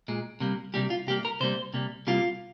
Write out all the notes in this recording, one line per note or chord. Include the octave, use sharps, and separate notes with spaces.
A#2 G#3
C3 G3 A#3
C3 G3 A#3 G4
F4
C3 G3 A#3 G4
A#4
C3 G3 A#3 C5
C3 G3 A#3
C3 G3 A#3 F4